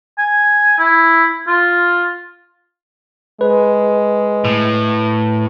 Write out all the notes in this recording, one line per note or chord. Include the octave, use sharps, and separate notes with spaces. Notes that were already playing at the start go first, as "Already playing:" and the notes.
G#5
E4
F4
G#3 B4
A2